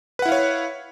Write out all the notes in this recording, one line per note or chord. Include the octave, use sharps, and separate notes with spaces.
E4 B4 C#5 F5 F#5